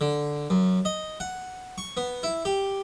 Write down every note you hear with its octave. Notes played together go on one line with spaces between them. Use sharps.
D3
F#2
D#5
F#5
C#6
B3
E4
G4